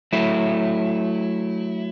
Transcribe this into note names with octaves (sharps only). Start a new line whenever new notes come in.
F#3 A3 E4